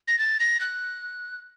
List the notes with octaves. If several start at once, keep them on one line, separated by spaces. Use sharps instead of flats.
A#6
A6
A#6
F#6